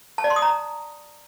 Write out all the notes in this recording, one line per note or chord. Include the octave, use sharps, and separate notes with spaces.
A5
D5
C6
D#6
A#5